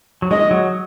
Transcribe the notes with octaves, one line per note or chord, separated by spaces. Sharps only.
F#3
G#3 D#5
F#3